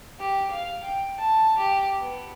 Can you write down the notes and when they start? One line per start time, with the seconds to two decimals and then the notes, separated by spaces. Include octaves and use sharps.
0.20 G4
0.51 F5
0.83 G5
1.18 A5
1.58 G4
1.98 B3